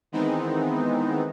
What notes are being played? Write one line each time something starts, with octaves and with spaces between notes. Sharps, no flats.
D#3 E3 G#3 B3 C4 D#4